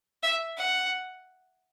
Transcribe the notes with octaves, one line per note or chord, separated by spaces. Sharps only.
E5
F#5